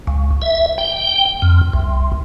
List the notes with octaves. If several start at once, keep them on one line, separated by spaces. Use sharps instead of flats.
C#2
E5
G5
F2
C2